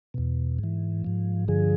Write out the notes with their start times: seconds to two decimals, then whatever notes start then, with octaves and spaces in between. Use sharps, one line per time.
0.14 E2 B2
0.59 G#2 E3
1.04 G#2 F3
1.48 G2 D3 F3 G#4